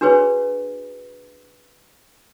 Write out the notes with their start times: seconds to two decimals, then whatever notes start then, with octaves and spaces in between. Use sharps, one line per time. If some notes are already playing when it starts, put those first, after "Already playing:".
0.01 D4 F#4 G#4 B4 C#5